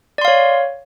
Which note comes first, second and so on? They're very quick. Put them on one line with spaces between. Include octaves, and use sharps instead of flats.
D5 C6 F5 C#5